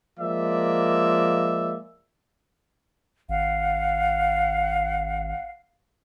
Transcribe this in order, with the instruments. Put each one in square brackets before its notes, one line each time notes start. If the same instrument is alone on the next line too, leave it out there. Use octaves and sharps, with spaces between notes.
[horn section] F3 G#3 A#3 D5 E5
[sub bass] G#1 [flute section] F5 F#5